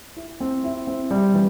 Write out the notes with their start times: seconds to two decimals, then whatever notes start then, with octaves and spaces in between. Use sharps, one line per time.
0.16 E4
0.40 C4
0.64 E4
0.87 C4
1.11 G3
1.34 E3